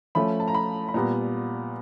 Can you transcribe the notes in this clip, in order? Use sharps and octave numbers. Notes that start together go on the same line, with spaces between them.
F3 A3 C#4 B5
A5
A#5
B5
B5
A#2 G3 B3 A#5